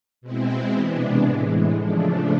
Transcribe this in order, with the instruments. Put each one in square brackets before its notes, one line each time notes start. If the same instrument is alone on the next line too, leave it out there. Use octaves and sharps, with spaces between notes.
[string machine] B2 G#3 C4 E4
C3 E3 G#3 B3 D4
A2 E3 G#3
C#3 F3 A3 D4